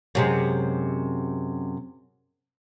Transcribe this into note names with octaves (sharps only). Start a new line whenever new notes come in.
F#2 C3 G#3